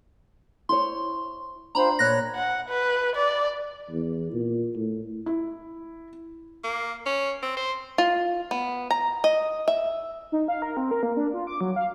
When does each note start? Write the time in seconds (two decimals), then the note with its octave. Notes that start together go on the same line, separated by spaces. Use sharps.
0.69 E4 C5 C#5 C6
1.75 D4 F4 C5 G5 A#5 B5
1.99 A#2 C#5 F#6 A#6
2.36 F#5
2.69 B4
3.16 D5
3.90 E2
4.33 A#2
4.75 A2
5.26 E4
6.64 A#3
7.06 C#4
7.43 C4
7.57 C5
7.98 F4
8.51 B3
8.91 A#5
9.24 D#5
9.68 E5
10.32 D#4
10.48 F5
10.62 A#4
10.77 C4
10.91 A#4
11.03 A#3
11.17 D4
11.34 F4
11.47 D6
11.61 F#3
11.76 F5